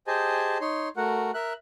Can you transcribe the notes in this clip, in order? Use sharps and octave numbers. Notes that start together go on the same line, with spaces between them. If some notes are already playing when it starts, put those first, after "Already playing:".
G4 G#4 C5 D#5 G#5 A5
D#4 C#5 C6
A3 F#4 A#4 F#5
A#4 E5 F#6